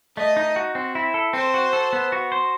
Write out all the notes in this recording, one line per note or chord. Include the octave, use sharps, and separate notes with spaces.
A3 D#5
D#4
F#4
C4
E4
A4
C4 C5
F#4
A4
B3
F#4
C5